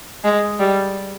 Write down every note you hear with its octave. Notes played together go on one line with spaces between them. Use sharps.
G#3
G3